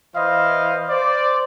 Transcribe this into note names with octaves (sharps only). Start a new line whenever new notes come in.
E3 E4 C5 D#5 F5
C5 D5